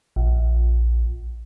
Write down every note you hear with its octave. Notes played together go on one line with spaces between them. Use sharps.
A#1